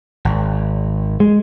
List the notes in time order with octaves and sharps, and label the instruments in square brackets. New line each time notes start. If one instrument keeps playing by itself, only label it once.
[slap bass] G#1
[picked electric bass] G#3